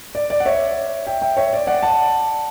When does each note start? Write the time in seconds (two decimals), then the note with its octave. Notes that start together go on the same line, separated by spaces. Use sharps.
0.15 D5
0.30 D5
0.40 F#5
0.45 C#5 E5
1.07 E5 G5
1.22 E5 G5
1.37 C#5 E5
1.53 D5
1.67 D5 F#5
1.83 F#5 A5